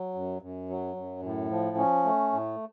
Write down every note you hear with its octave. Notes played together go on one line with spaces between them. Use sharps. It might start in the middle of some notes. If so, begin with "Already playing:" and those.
Already playing: F#3
F#2
F#2
F#3
F#2
A2
F3
C#4
A3
A2